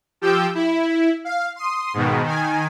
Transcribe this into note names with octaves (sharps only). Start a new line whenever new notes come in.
F3 G4 G5 E6 G6
E4
F5
C6 D#6
G#2 B2 D#3
D#3 G#5